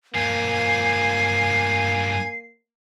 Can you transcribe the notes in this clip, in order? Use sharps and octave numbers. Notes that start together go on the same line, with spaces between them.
G2 F3 A#3 G#5 C7